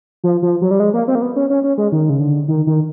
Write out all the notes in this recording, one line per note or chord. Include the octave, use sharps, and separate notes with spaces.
F3
F3
F#3
G3
G#3
A#3
C4
A#3
B3
C#4
C#4
C#4
G#3
D#3
C#3
D3
D#3
D#3